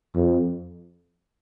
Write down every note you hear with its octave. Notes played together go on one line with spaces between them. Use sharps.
F2